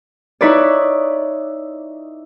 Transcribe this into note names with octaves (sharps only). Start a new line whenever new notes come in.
D#4 E4 B4 C#5 D5